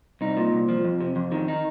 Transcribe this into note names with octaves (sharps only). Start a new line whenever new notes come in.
C2 D#4
A#2
C2
F3
F2
C3
F2
D#3
D#4